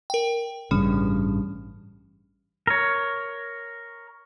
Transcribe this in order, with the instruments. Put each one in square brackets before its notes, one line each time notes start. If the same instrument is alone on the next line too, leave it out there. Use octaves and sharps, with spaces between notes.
[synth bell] A#4 G5
[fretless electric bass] A1 G2 C#3 [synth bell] G3
[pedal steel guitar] A#4 C#5